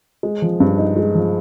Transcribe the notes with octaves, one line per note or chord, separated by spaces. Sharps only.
G#3
F3
G2
D#4
G#3
F3